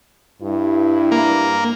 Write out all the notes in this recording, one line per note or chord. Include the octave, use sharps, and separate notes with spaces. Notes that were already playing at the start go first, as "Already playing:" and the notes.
G2 E4
A#3